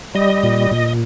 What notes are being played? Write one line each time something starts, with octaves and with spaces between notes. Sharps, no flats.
G3 D#5
A#2
A#2